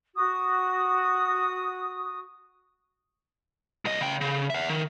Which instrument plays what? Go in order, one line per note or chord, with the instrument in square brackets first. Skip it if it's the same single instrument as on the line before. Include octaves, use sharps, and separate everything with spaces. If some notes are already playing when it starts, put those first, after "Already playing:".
[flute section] F#4 D#6
[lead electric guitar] C2 D#5
C#3 G5
C#3
E5 F#5
D#3